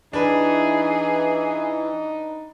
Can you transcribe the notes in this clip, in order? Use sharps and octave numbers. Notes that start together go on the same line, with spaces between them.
E3 D4 D#4 G#4 B4